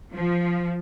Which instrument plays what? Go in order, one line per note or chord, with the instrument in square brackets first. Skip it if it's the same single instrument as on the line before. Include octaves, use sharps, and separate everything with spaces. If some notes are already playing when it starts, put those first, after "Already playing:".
[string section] F3